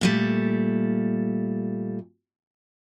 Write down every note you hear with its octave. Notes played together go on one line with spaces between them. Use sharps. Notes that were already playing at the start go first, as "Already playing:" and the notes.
A#2 G3 A3